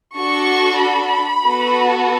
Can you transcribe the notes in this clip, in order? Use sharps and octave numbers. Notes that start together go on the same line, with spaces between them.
D4 F#4 A4 C#6
B5
B3 F#4 A4